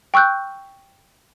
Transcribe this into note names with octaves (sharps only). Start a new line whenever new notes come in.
G5 C#6 E6 F#6 G6